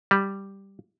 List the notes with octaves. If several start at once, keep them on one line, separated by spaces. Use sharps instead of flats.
G3